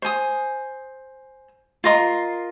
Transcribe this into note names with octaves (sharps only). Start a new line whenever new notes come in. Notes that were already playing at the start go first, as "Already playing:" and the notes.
C5 G#5 D#6
F4 A#4 D#5 C6